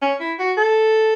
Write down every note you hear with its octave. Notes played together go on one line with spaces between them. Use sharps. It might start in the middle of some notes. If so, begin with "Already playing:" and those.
C#4
E4
F#4
A4